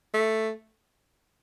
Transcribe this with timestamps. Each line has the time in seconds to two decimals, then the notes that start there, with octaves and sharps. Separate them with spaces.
0.14 A3